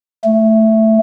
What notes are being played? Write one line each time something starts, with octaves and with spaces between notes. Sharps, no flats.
A3